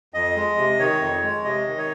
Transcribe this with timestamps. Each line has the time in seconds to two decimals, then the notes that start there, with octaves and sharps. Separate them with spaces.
0.14 F2 D#5
0.36 G#3
0.58 C3
0.79 D#3 C#5
1.01 F2
1.23 G#3
1.44 C3 D#5
1.67 D#3
1.78 C#5